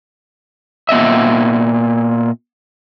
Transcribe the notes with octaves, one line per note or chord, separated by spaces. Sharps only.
A#2 B3 D#5 E5